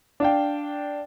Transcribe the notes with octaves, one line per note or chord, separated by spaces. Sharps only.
D4 F5 G5